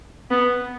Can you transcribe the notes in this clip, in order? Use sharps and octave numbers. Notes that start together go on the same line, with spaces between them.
B3